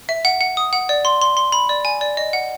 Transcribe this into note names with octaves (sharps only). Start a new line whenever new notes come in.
E5
F#5
F#5
D#6
F#5
D5
C6
C6
C6
B5
D5
G#5
D5
D#5
F#5